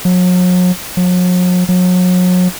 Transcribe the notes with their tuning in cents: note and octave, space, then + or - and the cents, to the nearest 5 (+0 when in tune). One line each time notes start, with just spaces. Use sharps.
F#3 -40
F#3 -45
F#3 -35